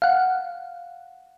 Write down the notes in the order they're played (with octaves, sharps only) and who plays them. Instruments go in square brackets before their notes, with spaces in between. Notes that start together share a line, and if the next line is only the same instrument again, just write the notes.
[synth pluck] F5 F#5